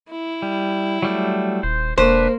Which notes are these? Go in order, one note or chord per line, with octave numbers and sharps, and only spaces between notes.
E4
G3
F#3 G3 A3
D#1 C5
E1 A#3 D4 B4 C5